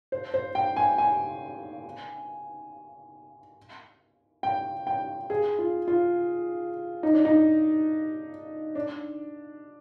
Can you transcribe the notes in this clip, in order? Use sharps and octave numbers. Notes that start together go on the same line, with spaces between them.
C5
C5
G5
G#5
G#5
G5
G5
G#4
F4
F4
D#4
D4
D#4
D4